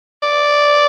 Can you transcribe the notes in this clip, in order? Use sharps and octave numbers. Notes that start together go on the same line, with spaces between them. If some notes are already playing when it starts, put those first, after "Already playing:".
D5